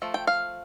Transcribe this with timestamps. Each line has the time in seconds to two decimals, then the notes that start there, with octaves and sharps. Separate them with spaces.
0.02 F3 A3
0.14 G5
0.27 F5